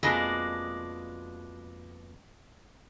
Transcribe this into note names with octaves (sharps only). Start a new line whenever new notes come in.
F2 B2 G#3 A#3 D4